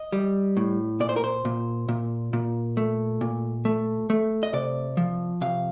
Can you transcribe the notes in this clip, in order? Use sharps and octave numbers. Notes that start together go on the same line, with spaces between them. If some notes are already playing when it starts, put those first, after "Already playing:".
Already playing: D#5
G3
A2
A#2 D5
C5
A#4
C5
A#2
A#2
A#2
A3
A#2
A3
A3
D#5
C3 D5
F3
C3 F5